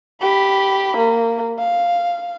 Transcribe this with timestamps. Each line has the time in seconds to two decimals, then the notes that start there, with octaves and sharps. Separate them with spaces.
0.22 G4 B5
0.97 A#3
1.59 F5